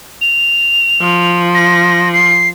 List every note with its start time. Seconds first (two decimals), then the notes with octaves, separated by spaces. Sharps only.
0.21 F7
1.01 F3
1.55 A#6
2.14 C7